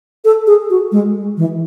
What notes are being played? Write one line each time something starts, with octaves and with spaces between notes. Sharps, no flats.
A4
G#4
F#4
G#3
E3